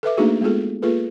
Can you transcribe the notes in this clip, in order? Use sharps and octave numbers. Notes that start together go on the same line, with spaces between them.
A4 B4 E5 D6
A3 A#3 D4 D#4 F#4 G#4
G#3 B3 F4 G#4 A4
A#3 F4 G#4 A4 B4